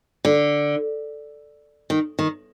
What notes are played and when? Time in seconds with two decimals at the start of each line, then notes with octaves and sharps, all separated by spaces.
0.25 D3
1.90 D#3
2.19 D#3